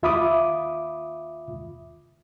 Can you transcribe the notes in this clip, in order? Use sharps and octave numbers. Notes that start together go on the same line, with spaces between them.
D#2 F4 E5 B5 D6 D#6